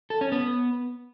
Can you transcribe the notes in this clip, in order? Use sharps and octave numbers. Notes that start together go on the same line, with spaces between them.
A4
C#4
B3